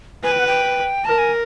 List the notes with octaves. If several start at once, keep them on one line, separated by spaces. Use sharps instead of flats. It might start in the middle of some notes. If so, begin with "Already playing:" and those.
B4 G#5
G5
F#5
G5
A#4 A5
G#5